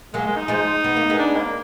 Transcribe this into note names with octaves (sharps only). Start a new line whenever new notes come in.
F#3 G#3 A#3
G#3
D#4
F3 G#3
B3
A#3
G#3 B3
D4
A#3